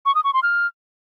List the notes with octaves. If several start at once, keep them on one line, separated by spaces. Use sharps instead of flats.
C#6
D#6
C#6
C6
F6